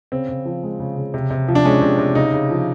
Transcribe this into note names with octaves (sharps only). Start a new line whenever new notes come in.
C#3 C4
C#3
F3
G#3
C#3
C#3
C3
C3
F3
D4
G#3 C#4
C3
C3
C#3 D#4
C#3
F3